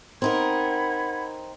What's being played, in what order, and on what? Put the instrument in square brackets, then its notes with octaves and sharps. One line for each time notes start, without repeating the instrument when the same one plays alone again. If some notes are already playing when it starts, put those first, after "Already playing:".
[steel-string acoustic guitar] C4 D#4 A#4 [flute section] F#5 B5 G#6